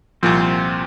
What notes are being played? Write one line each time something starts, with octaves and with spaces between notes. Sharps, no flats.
C2 A#2 F3 C4